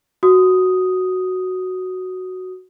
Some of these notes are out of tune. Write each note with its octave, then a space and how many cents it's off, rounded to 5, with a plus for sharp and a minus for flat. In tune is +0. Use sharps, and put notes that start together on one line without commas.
F#4 +0 D#6 +0